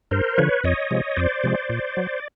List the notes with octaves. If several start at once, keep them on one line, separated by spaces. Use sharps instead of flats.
G2 A#4 C5
D3 F3 B4 C#5
F2 C#5 D#5
C3 F3 G#3
F2 C5 D5
C3 F3 G#3
A#2
F#3